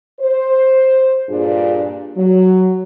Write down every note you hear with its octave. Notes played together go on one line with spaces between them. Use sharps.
C5
G2 A#2 D4 F4 G#4
F#3